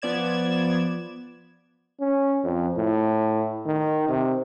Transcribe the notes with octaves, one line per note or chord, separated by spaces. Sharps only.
F3 B3 D5 G#6 E7
C#4
F2
A2
D#3
C3